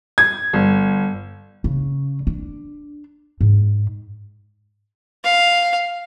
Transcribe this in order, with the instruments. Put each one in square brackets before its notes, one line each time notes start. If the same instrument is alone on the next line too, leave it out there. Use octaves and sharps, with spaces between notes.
[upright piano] G#6
G1
[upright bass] C#3
D4
G#2
[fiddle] F5